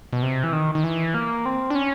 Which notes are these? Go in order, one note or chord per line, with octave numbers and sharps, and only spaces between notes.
B2
C3
E3
D#3
D#3
E3
A#3
C4
D4
C#4